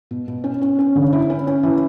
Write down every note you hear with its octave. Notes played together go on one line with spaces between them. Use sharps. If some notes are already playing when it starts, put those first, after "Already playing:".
B2
B2
C#4
C#4
C#4
D3
E4
C#4
C#4
E3